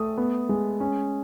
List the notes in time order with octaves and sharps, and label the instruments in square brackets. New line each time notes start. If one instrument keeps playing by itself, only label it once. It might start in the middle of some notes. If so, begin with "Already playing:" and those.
Already playing: [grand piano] A3 D#6
B3
G#3
C#4